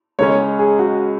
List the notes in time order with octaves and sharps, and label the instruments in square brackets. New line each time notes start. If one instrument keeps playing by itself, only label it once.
[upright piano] C#2 C#3 G#3 C#4 [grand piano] C#5
[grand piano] G#4
F#4